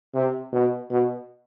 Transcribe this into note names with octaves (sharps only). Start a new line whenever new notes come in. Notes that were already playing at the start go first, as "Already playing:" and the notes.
C3
B2
B2